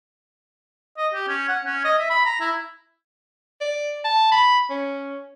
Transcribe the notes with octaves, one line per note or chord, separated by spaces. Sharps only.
D#5
G4
C#4
F#5
C#4
D#5
E5
B5
A#5
E4
D5
A5
B5
C#4